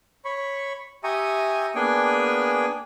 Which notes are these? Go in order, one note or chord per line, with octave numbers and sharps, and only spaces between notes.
C#5 B5 C#6
G4 E5 G#5 A#5 C#6 D#6
A#3 B3 D4 G#4 G5 G#5